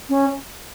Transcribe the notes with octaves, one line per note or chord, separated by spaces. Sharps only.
C#4